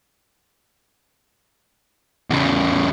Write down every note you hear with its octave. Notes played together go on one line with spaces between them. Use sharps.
E2 C#3